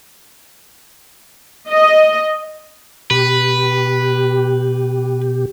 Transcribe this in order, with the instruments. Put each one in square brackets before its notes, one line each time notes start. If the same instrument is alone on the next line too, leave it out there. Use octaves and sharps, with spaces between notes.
[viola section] D#5
[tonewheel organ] B2 G4 [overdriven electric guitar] B4